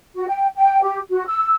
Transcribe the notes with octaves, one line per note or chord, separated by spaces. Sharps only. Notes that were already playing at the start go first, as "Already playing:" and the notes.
F#4
G5
G5
G4
F#4
E6